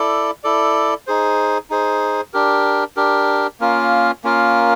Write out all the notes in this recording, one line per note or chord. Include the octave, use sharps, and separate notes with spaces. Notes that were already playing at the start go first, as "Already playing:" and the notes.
Already playing: E4 A4 D5
E4 A4 D5
D#4 G#4 C5
D#4 G#4 C5
D4 G4 A#4
D4 G4 A#4
A#3 C#4 F4 A#4
A#3 C#4 F4 A#4